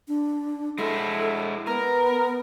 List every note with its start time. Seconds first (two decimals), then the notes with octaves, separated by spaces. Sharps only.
0.08 D4
0.79 G#3 E4 A4
1.67 B3 A#4